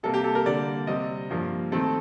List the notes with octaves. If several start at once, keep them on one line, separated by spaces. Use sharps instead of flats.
C3 G3 A#3 A4
G4
A4
A#4
D3 G3 A#3 D5
C3 G3 C4 D#5
G2 F3 A#3
D#3 A3 C4 A4